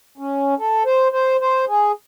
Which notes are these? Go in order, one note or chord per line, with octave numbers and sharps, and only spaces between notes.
C#4
A4
C5
C5
C5
G#4